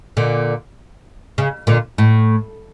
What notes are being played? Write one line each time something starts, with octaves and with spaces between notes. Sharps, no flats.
A#2 D3
C#3
A#2 D3
A2